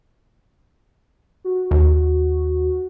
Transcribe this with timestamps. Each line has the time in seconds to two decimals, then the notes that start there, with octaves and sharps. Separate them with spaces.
1.44 F#4
1.71 D#2